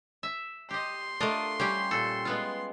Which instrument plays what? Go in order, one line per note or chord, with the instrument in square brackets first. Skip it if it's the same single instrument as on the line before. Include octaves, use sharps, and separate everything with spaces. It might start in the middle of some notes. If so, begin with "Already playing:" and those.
[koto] E5
[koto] G4 D#5 [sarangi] C6
[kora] A3 D4 [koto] F4 A#4 D#5
[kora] G3 C#4 [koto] G4
[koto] A#2 A4
G#3 B3 F4